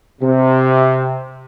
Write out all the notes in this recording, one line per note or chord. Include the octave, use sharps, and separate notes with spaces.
C3